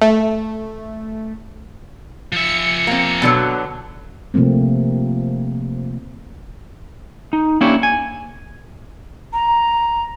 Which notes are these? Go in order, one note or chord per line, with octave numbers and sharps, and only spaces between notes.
A3
F3 E5 C#7
A#3 C4
B2 D3 F#3
C3 F3 A3 A#3 C4
D#4
A#3 C#4 D4 E4 G4 C#5
G#5
A#5